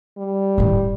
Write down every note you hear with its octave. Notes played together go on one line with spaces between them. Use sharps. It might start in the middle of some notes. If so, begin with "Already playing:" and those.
G3
A2 E4